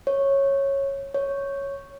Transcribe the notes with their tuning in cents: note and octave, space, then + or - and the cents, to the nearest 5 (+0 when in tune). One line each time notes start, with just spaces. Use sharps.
C#5 -10
C#5 +0